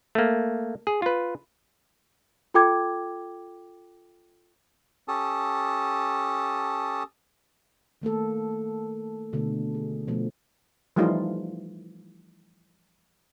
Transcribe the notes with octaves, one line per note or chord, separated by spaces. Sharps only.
A3 A#3
G#4
F4 B4
F4 A4 G5 D6 G#6
C#4 G4 A4 A5 D#6
D#3 A3 A#3 A4
B2 D3 A3
G#4
B2 F3 A3
E3 F3 G3 A3 D#4 F4